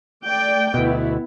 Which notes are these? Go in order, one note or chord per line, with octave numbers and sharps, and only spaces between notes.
A3 D5 G5
D2 B2 B3 E4